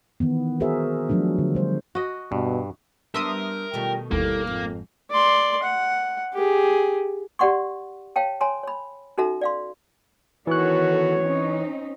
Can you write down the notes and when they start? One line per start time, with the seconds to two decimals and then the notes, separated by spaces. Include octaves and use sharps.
0.20 D#3 E3 B3
0.60 F#4 G#4 A#4 C5 E5
1.09 F3 F#3 A3 D4 F#4
1.38 D3
1.55 G3 C5
1.95 F#4 D#5
2.32 G2 B2
3.14 G3 B3 D4 A#4 E5 C6 D#6
3.74 B2 D#3 G3 A3 F4 G5
4.11 G1 D#2 G3 A#3 E4 A4
4.47 F2 G#2
5.11 D5 C6
5.63 F#5
6.33 G4 G#4
7.39 G4 D5 F#5 C6 C#6
8.16 C#5 F5 G5 A5
8.41 C#5 G#5 A#5 C6
8.63 C#5 B5
9.18 C#4 D#4 F#4 A4 E5 A#5
9.41 D5 F5 C6
10.47 D#3 E3 B3 F#4 A4 C#5 F#6
11.21 C4 C#4 D#4